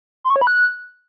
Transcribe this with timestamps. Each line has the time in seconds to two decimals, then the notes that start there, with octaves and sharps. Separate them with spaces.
0.24 C6
0.30 C#6
0.36 C#5
0.41 B5
0.47 F#6